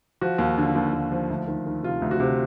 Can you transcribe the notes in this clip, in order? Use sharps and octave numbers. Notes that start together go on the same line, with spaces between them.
F3 F#4
D#2
D3
D#2
D#2
F3
D2
D#3
D#3
C3 F4
D2
F#4
C3